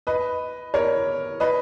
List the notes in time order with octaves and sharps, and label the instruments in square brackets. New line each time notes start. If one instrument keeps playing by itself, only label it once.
[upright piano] B4 D#5
A#4 C#5
B4 D#5